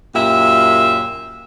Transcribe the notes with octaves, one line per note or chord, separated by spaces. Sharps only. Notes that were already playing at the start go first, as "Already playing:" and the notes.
F#2 A#2 G4 E5